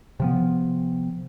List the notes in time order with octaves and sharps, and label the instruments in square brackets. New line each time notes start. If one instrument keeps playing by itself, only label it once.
[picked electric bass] C3 F3 B3